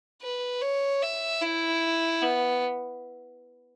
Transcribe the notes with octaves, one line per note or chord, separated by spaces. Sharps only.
B4
C#5
E5
E4
B3